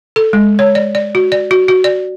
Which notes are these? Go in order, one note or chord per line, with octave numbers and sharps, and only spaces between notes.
A4
G#3
C#5
D5
D5
F#4
D5
F#4
F#4
D5